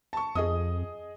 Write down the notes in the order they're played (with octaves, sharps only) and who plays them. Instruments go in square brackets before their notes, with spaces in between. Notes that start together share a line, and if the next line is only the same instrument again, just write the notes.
[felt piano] A5 C#6
[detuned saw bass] F2 [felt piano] G#4 D#5 D#6